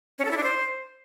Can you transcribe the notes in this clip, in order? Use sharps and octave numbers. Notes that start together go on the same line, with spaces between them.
C#4
A4
E4
D4
C5